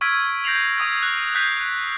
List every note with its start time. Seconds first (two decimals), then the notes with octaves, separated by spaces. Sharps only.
0.01 C#6 E6 F6 G#6 B6 D7
0.44 G6 A#6 C7 D7 F7 F#7
0.78 C#6 D#6 G#6
1.03 F#6
1.35 F#6 G6 B6 C7